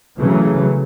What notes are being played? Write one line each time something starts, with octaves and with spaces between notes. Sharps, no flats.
C#3 E3 F#3 A3